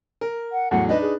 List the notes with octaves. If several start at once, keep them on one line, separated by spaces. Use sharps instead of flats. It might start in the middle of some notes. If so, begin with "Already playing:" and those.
A#4
F#5
E2 A2 F#3 F#5
D4 D#4 B4 D#5
G#4